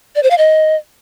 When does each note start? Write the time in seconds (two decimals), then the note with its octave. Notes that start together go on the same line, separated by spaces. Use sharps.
0.16 D5
0.23 C5
0.30 F5
0.38 D#5